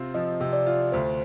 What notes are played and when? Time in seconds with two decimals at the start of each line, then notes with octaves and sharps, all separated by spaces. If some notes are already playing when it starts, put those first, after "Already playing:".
Already playing: C3 C4 F4
0.14 F3 D#5
0.40 C3
0.53 D5
0.67 F4
0.92 D2 C5